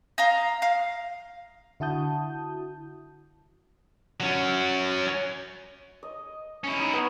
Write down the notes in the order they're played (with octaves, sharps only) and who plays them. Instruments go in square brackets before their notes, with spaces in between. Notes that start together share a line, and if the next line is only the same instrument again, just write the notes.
[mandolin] D#5 F5 A#5
F5
[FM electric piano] D3 E4 F#4 A5 D#6 G6
[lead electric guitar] F#3 C#4
[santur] D#5
[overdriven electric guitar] C#4 E4
[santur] D#4
B3